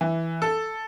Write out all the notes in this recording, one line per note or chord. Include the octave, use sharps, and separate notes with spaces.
E3
A4